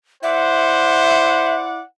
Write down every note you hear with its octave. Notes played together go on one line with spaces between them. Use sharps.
E4 C5 D5 E5 F#5